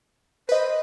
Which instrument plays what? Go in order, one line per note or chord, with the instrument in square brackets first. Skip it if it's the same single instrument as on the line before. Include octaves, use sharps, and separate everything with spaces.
[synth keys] B4 D#5 [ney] C5